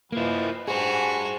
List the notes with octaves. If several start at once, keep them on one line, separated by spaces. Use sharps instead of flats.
F3 A#3 E4 B4 D#5
G2 F#4 G#4 C5 G#5